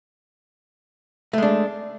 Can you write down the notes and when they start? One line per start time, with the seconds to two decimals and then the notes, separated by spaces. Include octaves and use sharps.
1.33 A3
1.38 G#3
1.42 D4